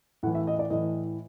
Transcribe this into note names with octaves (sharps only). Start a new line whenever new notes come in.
A2 E3 F#5
E5
D#5
D5
A2 E3 D#5